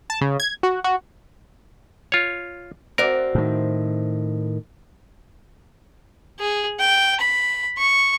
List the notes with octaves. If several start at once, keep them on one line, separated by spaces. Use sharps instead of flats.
A5
C#3
G#6
F#4
F#4
F4 C#5
C4 F#4 A#4 D5
A2 D#3
G#4
G5
B5
C#6